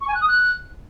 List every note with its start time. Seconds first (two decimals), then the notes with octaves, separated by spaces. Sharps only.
0.01 C#6
0.08 G#5
0.15 F#6
0.21 D#6
0.28 F#6